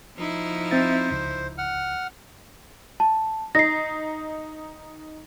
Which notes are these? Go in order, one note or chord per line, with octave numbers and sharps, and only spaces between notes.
F3 D#4 E4
C4 C5 E5 A6
C#2
F#5 F6
A5
D#4 A#6 C7